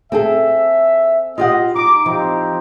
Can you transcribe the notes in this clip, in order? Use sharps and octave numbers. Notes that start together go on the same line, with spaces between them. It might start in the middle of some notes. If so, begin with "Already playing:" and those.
C4 G#4 A4 E5
F4 G4 D#5 F#5
D#4 A#5 D6
F3 C4 D#4 G4